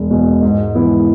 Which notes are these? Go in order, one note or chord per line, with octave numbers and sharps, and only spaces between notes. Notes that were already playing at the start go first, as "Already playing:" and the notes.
Already playing: E1
E2 B2
G#2
E3 B3 E4